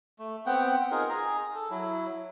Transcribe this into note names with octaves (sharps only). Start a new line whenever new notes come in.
A3
B3 C4 F#5 G5
D#4 F4 G#4 A#4
G#4 A#5
A4
F#3 E4